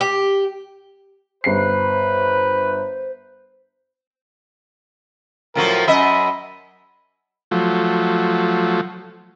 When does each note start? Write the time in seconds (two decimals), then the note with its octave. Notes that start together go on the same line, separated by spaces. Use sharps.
0.01 G4
1.44 G1 B4 C5 C7
5.55 A2 F3 F#3 A#4
5.88 F#2 D#5 E5 B5
7.51 F3 F#3 A3